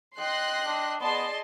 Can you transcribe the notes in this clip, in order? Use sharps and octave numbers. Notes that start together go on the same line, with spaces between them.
D#5 G5 C6 F#6 A#6
D4
B3 G#4 D5 D#5 A5 C6